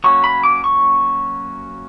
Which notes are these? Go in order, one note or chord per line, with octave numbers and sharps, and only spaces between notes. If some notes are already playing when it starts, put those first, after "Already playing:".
F#3 A#3 C#4 C#6
B5
D6
C#6